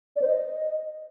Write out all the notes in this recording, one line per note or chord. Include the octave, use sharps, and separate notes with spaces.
D5
C5
D#5